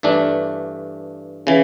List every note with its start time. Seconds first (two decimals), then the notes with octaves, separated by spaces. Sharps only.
0.03 G2 E3 A3 D4
1.47 C#3 E3